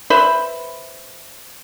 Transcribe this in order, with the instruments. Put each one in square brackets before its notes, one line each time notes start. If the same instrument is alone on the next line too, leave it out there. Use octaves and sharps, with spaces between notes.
[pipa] B4 C5 E5 B5